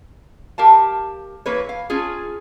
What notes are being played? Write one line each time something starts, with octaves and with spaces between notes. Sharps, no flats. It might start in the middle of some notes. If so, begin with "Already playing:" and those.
G4 A#4 F5 A5
E3 A#3 B4 C#5
F5
C#4 F4 G#4